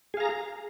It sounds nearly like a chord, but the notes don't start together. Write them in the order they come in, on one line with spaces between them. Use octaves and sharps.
G#4 F5 A#5